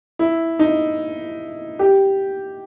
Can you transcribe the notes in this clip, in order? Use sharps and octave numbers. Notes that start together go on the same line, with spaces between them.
E4
D#4
G4